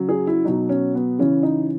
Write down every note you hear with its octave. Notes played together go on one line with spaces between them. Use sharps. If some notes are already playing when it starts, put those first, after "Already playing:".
Already playing: C#3 F#3
G#4
E4
B2 F#3 D#4
C#4
B3
C#3 E3 C#4
D#4